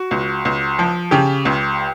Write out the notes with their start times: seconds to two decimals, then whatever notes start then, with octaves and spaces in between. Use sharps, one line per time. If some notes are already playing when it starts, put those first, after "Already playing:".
Already playing: F#4
0.11 C#2
0.45 C#2
0.79 F3
1.11 C#3 G4
1.45 C#2